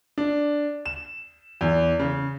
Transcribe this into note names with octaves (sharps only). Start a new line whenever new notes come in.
D4
E7
E2
C#3